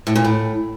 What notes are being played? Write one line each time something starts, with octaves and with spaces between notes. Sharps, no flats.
A2
A#2
A2